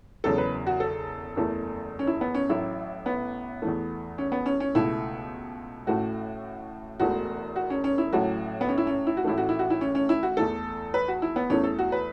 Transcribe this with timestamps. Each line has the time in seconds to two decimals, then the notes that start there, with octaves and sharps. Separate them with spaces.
0.24 E1 E2 C#3 F#3 A4
0.38 B4
0.67 F#4
0.80 A4
1.36 F#1 E2 E3 A3
1.99 C#4
2.07 E4
2.21 B3
2.35 C#4
2.49 A1 A2 F#3 E4
3.06 B3
3.62 E2 E3 A3
4.18 C#4
4.32 B3
4.46 C#4
4.60 C#4
4.75 C#2 B2 A3 E4
5.86 A1 A2 A3 F#4
7.00 E1 E2 E3 A3 F#4
7.56 F#4
7.70 C#4
7.84 C#4
7.98 E4
8.13 A1 A2 F#3 A3 F#4
8.61 B3
8.69 C#4
8.78 E4
8.87 C#4
9.07 E4
9.17 F#4
9.24 A1 A2 E3 A3 E4
9.38 F#4
9.49 E4
9.59 F#4
9.70 E4
9.81 C#4
9.95 C#4
10.09 E4
10.23 F#4
10.37 E2 E3 A3 A4
10.94 B4
11.08 F#4
11.22 E4
11.36 B3
11.50 E2 E3 A3 C#4
11.64 A4
11.79 F#4
11.92 B4